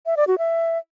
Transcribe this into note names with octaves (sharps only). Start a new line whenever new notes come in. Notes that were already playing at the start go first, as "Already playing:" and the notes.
E5
D5
F#4
E5